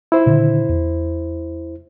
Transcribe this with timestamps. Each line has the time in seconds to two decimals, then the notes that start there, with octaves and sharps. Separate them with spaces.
0.12 E4 C5
0.26 A#2 D3 D#3
0.69 E2